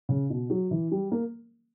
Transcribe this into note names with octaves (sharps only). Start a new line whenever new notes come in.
C#3
B2
F#3
E3
G3
A#3